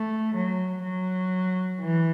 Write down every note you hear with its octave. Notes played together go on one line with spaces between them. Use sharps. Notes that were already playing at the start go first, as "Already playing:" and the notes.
Already playing: A3
F#3
F#3
E3